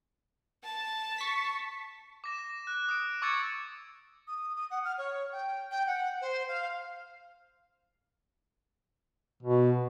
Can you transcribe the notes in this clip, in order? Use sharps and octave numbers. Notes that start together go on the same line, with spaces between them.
A5
C#6 B6
D6 A#6 E7
A#6
F#6
D#6 D7
C#6 D6 E6 G#6 A6 C#7
D#6
D#6
F#5
F6
C#5
G5
G5
F#5
C5
F5
B2